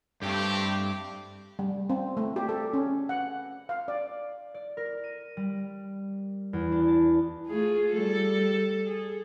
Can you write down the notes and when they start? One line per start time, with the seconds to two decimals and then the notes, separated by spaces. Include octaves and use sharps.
0.22 G2 A3 C4 G4
1.59 G3
1.90 C4
2.17 A3
2.36 G4
2.49 A4
2.74 C#4
3.09 F#5
3.69 F5
3.88 D5
4.54 D5
4.77 A#4
5.04 D#7
5.37 G3
6.53 E2
6.72 D4
6.88 A5
7.48 A3 F4 G#4
7.93 G3 A4
8.86 G#4